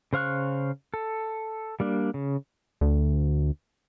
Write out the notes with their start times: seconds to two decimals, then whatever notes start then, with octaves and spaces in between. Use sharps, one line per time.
0.13 C#3 C5 F5 C#6 F#6
0.94 A4
1.80 G3 A#3 D4
2.14 C#3
2.81 D2